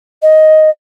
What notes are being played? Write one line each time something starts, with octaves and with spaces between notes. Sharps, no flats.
D#5